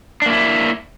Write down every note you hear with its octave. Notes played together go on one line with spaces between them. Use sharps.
A#3 D4 E4